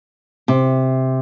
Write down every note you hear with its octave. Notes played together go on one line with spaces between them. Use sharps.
C3